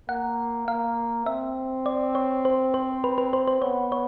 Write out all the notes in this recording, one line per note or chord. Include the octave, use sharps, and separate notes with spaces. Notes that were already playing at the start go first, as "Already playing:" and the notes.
A#3 F#5
A#3 F5
C4 E5
D5
C#5
C5
C5
B4
B4
C5
C5
B3 C#5
C#5